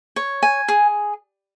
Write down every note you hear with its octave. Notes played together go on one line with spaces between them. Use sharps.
C#5
G#5
G#4